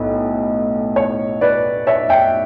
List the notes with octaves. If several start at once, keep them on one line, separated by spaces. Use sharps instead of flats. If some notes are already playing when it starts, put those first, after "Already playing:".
Already playing: B1 A2 B3
C#5
B4 D5
C#5 E5
E5 G5